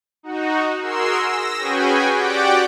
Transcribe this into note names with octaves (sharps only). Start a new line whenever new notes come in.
D#4 F#4
F#4 G#4 A#4 C6 E6
E6 A#6
C#4 F#4 G#4 B4 G5 G#5
F#4 G4 D5 F#5 G5 D6